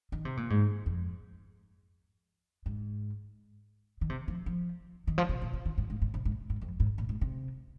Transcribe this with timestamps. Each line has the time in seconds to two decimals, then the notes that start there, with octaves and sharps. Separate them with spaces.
0.12 D#3
0.25 C3
0.37 A#2
0.50 G#2
0.86 F2
2.66 G#2
4.01 D#3
4.10 C3
4.28 F3
4.46 F3
5.07 D#3
5.18 F3
5.29 C3
5.41 A#2
5.53 C3
5.65 D#3
5.78 G#2
5.90 G#2
6.02 G#2
6.14 C3
6.25 G#2
6.50 G#2
6.62 F2
6.80 G#2
6.98 A#2
7.09 G#2
7.21 C3